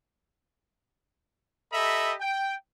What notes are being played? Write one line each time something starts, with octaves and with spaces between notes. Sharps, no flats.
G4 A4 D#5 E5 A#5 B5
G5